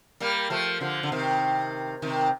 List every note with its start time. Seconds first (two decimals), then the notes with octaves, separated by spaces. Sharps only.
0.20 G3 A#3
0.50 F3 A3
0.81 D3 F3
1.03 D3
1.12 C3 D#3
2.02 C3 D#3